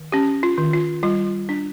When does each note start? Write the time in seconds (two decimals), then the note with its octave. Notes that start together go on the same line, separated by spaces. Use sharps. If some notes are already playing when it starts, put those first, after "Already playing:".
Already playing: D#3
0.12 C#4 G4
0.43 F4
0.58 D#3
0.73 F4
1.03 G3 F4
1.49 D4